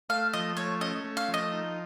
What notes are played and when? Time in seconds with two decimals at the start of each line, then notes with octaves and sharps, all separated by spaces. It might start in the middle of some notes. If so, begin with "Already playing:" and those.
0.09 A3 F5
0.33 F3 D#5
0.57 A3 C#5
0.81 C#4 D#5
1.04 A3
1.17 F5
1.28 F3
1.34 D#5
1.52 D#4